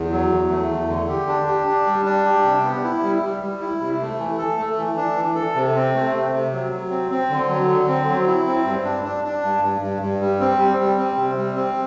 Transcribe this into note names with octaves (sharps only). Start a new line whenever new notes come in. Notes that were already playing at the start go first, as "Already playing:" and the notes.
Already playing: E2
F#3
E2
A3
E2
D3
G4
D4
G4
D4
G3
D4
G4
C3
B3
E4
G3
G3
G3
E4
C3
A3
E3
A4
A3
E3
D4
E3
A4
C3
C4
A3
C3
C3
F#3
F#3
C4
C4
D3
F#3
D3
C4
F#3
E4
C4
G2
D4
D4
D4
G2
G2
G2
G2
G3
C4
G3
G3
C4
C3
G3
C4